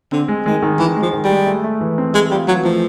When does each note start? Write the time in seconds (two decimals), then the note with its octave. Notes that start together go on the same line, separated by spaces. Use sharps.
0.12 D3 C4
0.28 G#3
0.46 D#3 G#3
0.63 D#3
0.79 D#3 E3
0.96 G#3
1.02 F3
1.13 D#3
1.24 G3
1.30 G#3
1.47 A3
1.64 A3
1.81 E3
1.98 C4
2.14 G#3 A3
2.31 G3 F4
2.48 E3 F#3
2.64 F3 A3